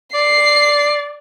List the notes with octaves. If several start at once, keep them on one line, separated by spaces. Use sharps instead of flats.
D5 C7